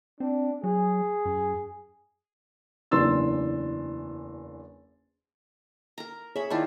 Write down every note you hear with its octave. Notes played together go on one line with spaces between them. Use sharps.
C4 D4
F#3 G#4
F#2
F#1 E2 D4 C6 E6 A6
A#4 A#5
G#4 C#5 E5 B5
D#3 E4 F4 D5 A5 B5